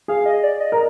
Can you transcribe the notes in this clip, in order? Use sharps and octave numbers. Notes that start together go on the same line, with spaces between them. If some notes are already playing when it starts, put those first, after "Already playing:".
G#4 F5
D#5
D5
D#5
A#4